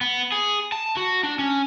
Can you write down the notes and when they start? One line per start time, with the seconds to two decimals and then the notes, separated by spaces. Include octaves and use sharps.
0.01 B3
0.32 G#4
0.72 A5
0.97 F#4
1.23 D4
1.39 C#4